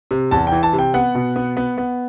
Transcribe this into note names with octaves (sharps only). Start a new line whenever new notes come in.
C3
E2 A5
E3 G5
A5
C3
G5
B3 F#5
B2
B3
B3
B3